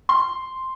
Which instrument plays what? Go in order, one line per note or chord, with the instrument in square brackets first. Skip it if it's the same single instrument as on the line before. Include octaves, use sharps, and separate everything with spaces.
[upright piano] C6